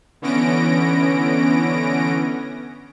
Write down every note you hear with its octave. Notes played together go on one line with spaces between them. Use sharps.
D3 E3 B3 C#4 A#6 D7